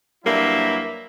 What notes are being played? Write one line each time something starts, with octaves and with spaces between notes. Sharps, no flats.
G2 F#3 G3 A#3 E4 E5